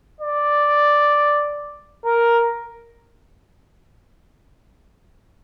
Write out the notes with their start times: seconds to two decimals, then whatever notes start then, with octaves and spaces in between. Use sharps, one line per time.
0.21 D5
2.05 A#4